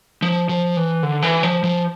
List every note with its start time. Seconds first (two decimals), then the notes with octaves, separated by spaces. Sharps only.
0.22 F3
0.49 F3
0.77 E3
1.03 D3
1.22 E3
1.43 F3
1.64 F3